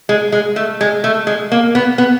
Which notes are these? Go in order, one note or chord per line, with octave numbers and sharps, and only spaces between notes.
G#3
G#3
A3
G#3
A3
G#3
A#3
B3
B3